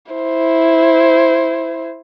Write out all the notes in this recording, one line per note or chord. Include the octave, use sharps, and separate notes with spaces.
E4 C5